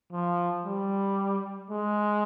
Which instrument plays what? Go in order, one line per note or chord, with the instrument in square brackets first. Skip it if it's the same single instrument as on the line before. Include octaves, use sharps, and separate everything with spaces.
[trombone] F3
G3
G#3